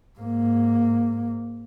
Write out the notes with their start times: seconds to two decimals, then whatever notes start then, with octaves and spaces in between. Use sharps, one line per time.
0.19 G#2 A#3